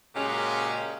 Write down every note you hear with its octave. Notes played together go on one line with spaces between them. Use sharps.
A#2 C#3 G#3 C#4 F#4 G4